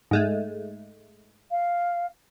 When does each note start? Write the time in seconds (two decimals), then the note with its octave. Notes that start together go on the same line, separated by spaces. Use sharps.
0.11 G#2 G#3 A3
1.51 F5